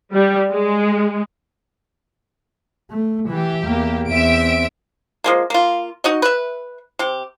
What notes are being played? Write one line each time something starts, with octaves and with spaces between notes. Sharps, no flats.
G3
G#3
A3
E3 G4 E5
E2 A#3
E2 C4 E5 D7
F3 G#3 A#3
A#3 F4
D#4 F#4 D#5
B4 E5
C3 G4